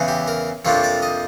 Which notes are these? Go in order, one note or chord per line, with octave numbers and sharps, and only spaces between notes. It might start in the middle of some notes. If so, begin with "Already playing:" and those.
Already playing: E2 C#3 E3
G4
A#4
F2 C3 F3 A#3 D4 C#5
D5
D#5